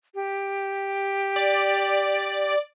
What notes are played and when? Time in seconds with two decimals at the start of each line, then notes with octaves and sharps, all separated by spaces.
0.15 G4
1.36 D5